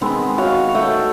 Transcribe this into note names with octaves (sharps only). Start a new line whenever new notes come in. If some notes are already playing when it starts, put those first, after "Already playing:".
D#3 G#3 B3 C4
F#4 C#5 F5
A3 F#5 G5